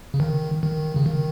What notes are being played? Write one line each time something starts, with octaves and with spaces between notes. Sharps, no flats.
C#3
D#3
D#3
C#3
D#3